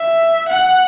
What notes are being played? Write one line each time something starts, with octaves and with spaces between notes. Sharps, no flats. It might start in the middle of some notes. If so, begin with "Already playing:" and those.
Already playing: E5
F#5